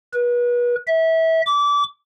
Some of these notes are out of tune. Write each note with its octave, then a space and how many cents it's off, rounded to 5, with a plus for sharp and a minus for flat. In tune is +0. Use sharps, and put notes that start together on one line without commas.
B4 -35
E5 -25
D6 -25